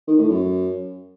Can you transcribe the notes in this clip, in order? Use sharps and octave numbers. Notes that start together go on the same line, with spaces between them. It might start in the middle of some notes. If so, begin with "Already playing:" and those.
D#3
A2
F#2